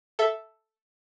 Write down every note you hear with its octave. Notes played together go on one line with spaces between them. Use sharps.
A4 E5